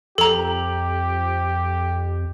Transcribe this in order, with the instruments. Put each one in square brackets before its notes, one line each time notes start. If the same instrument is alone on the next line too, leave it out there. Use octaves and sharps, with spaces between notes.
[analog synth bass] F2 [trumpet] G4 [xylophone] A4 A#5